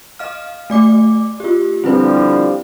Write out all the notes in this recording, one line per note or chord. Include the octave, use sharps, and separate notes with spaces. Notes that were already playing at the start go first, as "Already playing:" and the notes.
D#5 F5 F6
A3 D5 D6
F4 G4
D3 F3 G3 C4 E4 B4